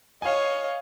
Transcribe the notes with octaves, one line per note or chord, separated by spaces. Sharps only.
C#5 D#5 F5 G#5